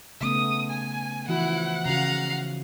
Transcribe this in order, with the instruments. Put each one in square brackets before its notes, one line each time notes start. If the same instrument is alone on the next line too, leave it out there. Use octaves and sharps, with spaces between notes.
[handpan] C#3 A3 B3 [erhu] D#6
[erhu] G#5
[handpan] E3 F3 F#4 [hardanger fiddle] E4 [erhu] F#5
[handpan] C#3 F#4 [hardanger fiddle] F5 A#5